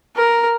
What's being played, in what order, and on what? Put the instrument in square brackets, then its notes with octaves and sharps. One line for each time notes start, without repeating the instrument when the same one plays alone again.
[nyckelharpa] A#4